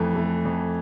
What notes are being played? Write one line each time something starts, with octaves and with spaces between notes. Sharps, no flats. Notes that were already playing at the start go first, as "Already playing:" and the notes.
Already playing: F2 E3 A3
A3
F2